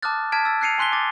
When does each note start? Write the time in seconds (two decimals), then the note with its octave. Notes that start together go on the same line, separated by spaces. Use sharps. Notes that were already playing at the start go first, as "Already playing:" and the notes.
0.03 A5 D6 D#6 F6 F#6 A6
0.32 A5 F6 G#6 B6 D7
0.45 E6 A6
0.61 F#6 G#6 C7 C#7 D#7 F7
0.78 G#5 C6 F#6 B6 G7
0.92 D6 A6